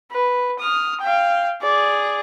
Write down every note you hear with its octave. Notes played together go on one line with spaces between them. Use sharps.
B4
D#6 F6
F5 G5
G#4 D5